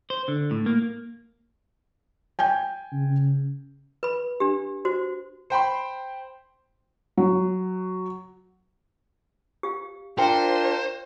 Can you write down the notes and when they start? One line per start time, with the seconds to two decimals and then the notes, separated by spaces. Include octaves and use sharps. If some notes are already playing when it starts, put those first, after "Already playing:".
0.10 C5
0.28 D3
0.51 A2
0.66 A#3
2.39 G5 G#5 G6
2.93 C#3
4.03 B4 B5
4.40 D4 G4
4.85 F#4 C5
5.50 C5 G5 B5 C6
7.17 F#3
9.63 G4 F5
10.19 D4 F4 A#4 C5 G5